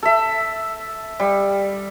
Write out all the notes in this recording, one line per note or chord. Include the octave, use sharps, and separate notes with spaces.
A4 E5
G3